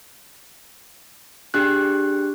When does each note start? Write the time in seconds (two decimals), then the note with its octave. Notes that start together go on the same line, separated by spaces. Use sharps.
1.54 D4 G4 G#4 F#6